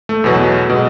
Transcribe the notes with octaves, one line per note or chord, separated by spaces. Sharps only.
A3
E2 B2 F#3
B2 G#3